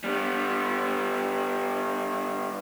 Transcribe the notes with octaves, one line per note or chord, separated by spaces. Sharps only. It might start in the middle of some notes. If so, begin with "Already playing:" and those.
G3 B3